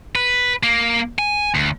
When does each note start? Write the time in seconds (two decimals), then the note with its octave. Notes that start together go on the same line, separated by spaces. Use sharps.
0.16 B4
0.63 A#3
1.19 G#5
1.55 D2